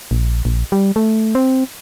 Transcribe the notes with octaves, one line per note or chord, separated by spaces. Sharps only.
A#1
A#1
G3
A3
C4